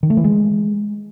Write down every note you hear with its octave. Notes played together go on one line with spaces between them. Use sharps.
D#3
A3
E3
G#3